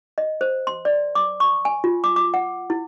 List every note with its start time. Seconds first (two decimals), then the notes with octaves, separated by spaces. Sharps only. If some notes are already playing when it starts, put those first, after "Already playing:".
0.18 D#5
0.41 C5
0.67 C6
0.85 D5
1.15 D6
1.40 C#6
1.65 G#5
1.84 F4
2.04 D6
2.16 D6
2.34 F#5
2.70 E4